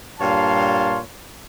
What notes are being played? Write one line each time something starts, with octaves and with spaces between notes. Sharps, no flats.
G2 A#2 C#5 F5 A5 C6